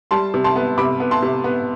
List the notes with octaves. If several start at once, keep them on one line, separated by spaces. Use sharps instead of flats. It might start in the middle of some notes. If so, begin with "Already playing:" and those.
G3 A5 C6
C3
A5 C6
B3
C3 B5 D6
B3
A5 C6
C3
B3